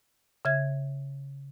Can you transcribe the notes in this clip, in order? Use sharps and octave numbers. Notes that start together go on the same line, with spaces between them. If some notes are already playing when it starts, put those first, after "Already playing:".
C#3 E5 G#6